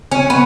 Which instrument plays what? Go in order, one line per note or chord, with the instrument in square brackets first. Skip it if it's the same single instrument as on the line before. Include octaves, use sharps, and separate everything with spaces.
[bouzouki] C#4
B3